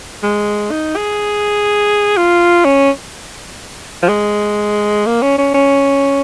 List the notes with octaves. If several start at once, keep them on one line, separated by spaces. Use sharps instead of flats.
G#3
D#4
G#4
F4
C#4
F3
G#3
A#3
C#4
C#4
C#4